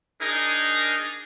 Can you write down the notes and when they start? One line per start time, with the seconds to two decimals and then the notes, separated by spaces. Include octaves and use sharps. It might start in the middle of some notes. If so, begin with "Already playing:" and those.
0.21 D4 D#4 G#4 A#4